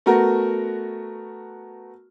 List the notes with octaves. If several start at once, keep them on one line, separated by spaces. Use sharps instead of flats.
A3 B3 F#4 A#4